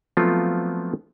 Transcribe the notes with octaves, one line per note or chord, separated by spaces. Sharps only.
F3 F#3 A3 B3 C4 F4